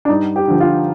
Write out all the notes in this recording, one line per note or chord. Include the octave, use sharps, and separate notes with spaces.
D4
G2 D#4
G4
D3 F3
F4